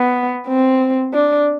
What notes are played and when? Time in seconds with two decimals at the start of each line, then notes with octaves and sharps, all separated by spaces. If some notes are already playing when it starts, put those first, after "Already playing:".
Already playing: B3
0.47 C4
1.14 D4